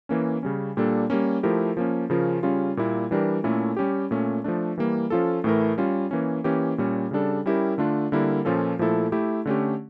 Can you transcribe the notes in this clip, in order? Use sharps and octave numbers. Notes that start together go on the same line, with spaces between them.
E3 A#3 C#4
C#3 G3 C#4
A#2 G3 A#3 D4 A4
G3 A#3 C#4
F3 A3 E4 G4 A#4
F3 A#3 C#4
C#3 F3 C#4 F4 A#4
C#3 G3 C#4 F4
A#2 G3 A#3 E4
E3 G3 D4 G4 A#4
A#2 A3 C#4 E4 A4
G3 C#4 G4
A#2 A3 C#4
F3 A3 D4
E3 G3 A#3
F3 C#4 F4 A4
A2 E3 A3 E4 A#4
G3 C#4 F4
E3 A#3 C#4
E3 A#3 C#4 G4
A#2 G3 C#4
C#3 G3 D4 A4
G3 C#4 E4 G4 A#4
D3 A3 D4 F4
D3 G3 A#3 E4 A#4
A#2 F3 C#4 F4 A4
A#2 F3 A3 E4 A4
A3 E4 G4
D3 A3 C#4 G4